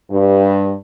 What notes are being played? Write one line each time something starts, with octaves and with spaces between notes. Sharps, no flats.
G2